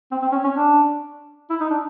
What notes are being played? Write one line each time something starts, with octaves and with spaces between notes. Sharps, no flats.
C4
C4
C#4
C#4
D4
E4
D#4
D4